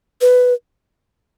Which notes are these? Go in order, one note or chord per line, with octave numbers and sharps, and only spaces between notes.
B4